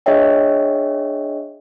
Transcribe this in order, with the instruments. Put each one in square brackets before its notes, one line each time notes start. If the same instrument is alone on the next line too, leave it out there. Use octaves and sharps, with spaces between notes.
[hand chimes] D4 G#4 C#5 D#5 E5 G5